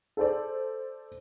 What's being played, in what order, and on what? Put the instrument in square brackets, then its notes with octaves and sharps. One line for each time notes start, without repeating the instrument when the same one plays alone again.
[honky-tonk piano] A4 C5 D5